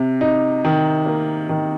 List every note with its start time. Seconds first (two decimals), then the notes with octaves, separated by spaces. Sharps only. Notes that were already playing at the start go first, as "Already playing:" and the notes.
Already playing: C3
0.21 D#4
0.65 D#3
1.06 A#3
1.49 D#3